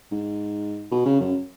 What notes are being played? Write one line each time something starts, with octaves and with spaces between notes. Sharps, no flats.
G#2
B2
C#3
F#2